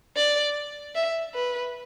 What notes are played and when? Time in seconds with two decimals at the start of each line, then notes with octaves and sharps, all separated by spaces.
0.16 D5
0.95 E5
1.35 B4